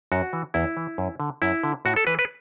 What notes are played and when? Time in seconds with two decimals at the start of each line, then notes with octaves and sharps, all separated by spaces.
0.12 F#2 F#4
0.33 E3
0.54 E2 E4
0.77 E3
0.98 F#2
1.20 D3
1.42 F#2 E4
1.63 D3
1.85 A2 F#4
1.96 A4
2.07 E3 B4
2.19 B4